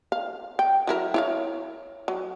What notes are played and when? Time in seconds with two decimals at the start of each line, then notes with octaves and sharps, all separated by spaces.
0.12 F5
0.59 G5
0.87 F#3 E4 A#4
1.14 E4 C#5 F5
2.08 F#3